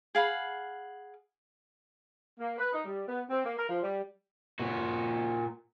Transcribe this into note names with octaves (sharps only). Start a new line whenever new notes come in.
G#4 F5 F#5 B5
A#3
B4
D#4
G3
B3
C4
A#3
A#4
F3
G3
A#2 F#4